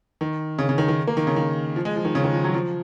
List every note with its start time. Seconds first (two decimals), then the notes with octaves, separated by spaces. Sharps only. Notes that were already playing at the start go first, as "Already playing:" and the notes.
0.21 D#3
0.59 C#3
0.69 C#3
0.78 D#3
0.88 D#3
1.07 A#3
1.17 D#3
1.27 C#3
1.36 D#3
1.76 F3
1.85 G#3
1.96 F3
2.05 D#3
2.15 C#3
2.24 D#3
2.34 F3
2.44 F#3
2.54 F3